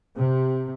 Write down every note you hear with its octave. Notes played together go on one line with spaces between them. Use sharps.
C3